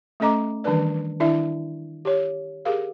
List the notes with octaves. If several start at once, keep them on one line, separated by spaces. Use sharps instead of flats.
A3 C#4 A4 D#5 A#5 D6
D#3 E3 G3 D4 B4 D5
D#3 D4 E4 D5 E5
G4 C#5
G4 G#4 A#4 F5